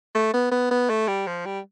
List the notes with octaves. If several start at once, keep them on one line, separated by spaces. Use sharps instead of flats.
A3
B3
B3
B3
A3
G3
F3
G3